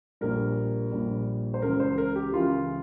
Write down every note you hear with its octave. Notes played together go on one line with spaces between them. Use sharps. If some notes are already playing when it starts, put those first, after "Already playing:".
A#1 A#2 G3 A#4
A#1 A#2 G3
C5
C#2 C#3 E3 A#4
C5
A#4
G4
C#2 C#3 E3 F4